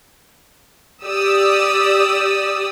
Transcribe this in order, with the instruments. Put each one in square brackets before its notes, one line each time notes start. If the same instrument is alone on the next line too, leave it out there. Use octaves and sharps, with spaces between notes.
[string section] G4 D5 D#6 E6